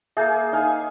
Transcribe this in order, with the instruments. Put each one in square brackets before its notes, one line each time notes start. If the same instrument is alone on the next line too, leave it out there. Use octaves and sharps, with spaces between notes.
[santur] A#3 G#4 [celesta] E5 G6
[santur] D#4 F5 G#5